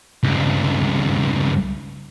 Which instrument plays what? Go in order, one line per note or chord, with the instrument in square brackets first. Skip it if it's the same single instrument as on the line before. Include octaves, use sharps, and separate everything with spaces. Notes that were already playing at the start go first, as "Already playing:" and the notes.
[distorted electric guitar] C#2 G2